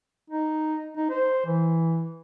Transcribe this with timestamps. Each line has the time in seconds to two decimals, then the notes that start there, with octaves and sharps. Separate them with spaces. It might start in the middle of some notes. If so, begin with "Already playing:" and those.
0.30 D#4
0.96 D#4
1.10 C5
1.46 E3